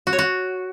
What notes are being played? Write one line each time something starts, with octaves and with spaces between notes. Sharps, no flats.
F#4
C#5
F#4